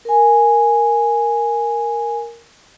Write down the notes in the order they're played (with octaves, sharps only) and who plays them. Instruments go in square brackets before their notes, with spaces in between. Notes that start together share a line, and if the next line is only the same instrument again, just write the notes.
[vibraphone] A#4 G#5